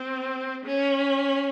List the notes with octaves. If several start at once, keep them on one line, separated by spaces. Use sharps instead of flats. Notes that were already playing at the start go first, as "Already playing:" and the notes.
Already playing: C4
C#4